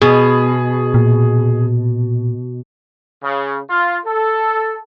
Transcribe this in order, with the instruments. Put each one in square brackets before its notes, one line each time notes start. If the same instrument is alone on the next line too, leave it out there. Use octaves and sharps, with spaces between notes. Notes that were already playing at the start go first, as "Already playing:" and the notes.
[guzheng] B2 [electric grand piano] G#4
[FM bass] A#2
[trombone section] C#3
F4
A4